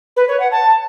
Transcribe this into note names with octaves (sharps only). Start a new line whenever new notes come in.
B4
C#5
F#5
A5